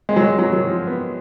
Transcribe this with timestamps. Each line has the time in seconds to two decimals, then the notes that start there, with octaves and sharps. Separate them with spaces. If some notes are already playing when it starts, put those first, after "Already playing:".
0.09 G#3
0.16 F#3
0.24 G#3
0.39 F#3
0.53 F#3
0.67 F3
0.87 B3